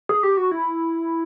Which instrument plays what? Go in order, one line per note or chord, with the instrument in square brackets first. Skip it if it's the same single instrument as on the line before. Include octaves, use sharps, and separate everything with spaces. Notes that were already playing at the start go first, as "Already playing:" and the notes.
[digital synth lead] G#4
G4
F#4
E4